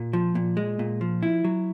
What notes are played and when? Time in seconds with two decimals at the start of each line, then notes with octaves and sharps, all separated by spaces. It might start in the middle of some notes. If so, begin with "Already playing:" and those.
Already playing: A#2
0.13 F3
0.35 A#2
0.57 G#3
0.79 A#2
1.01 F3
1.23 E4
1.44 F#3